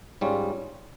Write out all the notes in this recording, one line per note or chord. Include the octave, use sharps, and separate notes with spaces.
G#2 G3 C#4 F4